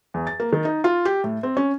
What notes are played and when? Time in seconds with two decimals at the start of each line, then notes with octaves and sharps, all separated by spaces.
0.14 E2
0.27 A6
0.40 A#3
0.52 D#3
0.65 D#4
0.84 F4
1.05 G4
1.24 A2
1.43 C4
1.57 C#4